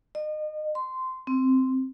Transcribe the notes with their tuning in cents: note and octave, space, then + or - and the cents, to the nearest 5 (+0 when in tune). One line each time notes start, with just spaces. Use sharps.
D#5 -35
C6 -15
C4 -5